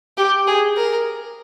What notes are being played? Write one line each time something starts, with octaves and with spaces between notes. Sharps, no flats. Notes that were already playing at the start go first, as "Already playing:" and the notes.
G4
G#4
A#4